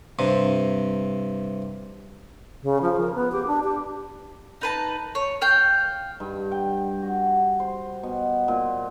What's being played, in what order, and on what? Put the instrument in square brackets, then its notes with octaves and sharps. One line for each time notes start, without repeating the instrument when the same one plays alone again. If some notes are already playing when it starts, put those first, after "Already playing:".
[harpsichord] G2 C3
[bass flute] C#3
F3
A#4
B3
G4
D4
G4
[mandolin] D#4 B4 A5
C#5
F5 G5
[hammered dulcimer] G2
G5
F#4
C5
B2
A#2